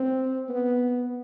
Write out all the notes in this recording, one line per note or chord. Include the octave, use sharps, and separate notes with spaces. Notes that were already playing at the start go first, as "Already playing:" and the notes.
Already playing: C4
B3